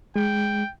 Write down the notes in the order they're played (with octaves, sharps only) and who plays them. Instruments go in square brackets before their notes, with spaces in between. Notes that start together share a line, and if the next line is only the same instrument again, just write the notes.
[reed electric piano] G#3 [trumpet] G5